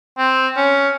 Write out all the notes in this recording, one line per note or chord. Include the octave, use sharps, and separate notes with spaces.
C4
C#4